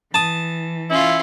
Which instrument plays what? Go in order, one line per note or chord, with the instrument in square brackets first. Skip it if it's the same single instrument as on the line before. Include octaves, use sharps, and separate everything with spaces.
[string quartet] E3 [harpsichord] A5 D#6
[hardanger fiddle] C#4 F4 [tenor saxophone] E4